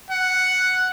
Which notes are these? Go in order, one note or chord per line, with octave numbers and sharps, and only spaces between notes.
F#5